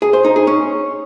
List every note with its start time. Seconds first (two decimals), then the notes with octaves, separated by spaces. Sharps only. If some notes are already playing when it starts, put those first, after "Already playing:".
0.02 G#4
0.13 C5
0.25 D#4
0.36 G#4
0.47 C#4